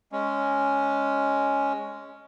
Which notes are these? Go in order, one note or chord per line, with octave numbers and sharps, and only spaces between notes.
G#3 C#4